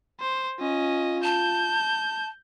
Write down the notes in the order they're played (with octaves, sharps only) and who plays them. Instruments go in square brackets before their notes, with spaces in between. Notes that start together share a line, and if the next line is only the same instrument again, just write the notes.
[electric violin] C5
[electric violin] C#4 D#5 [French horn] F4
[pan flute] A5 [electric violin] G6